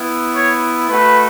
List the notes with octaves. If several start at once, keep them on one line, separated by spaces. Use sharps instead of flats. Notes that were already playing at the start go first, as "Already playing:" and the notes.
Already playing: B3 E4
C#5
A3 F#4 B4